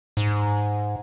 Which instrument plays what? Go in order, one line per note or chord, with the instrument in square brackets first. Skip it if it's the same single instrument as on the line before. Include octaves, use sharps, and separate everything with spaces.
[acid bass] G#2